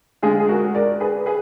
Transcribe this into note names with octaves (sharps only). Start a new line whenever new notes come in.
D3 G#3 F4 G#4
G#4
F#4 A#4
A#4 D5
G#4 B4
G#4 B4